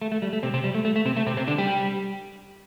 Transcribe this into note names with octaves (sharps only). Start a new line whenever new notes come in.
A3
A3
G3
A3
C3 C4
C3 C4
G3
A3
A3
A3
C3 C4
A3
C3 C4
C3 C4
D3 D4
G3 G4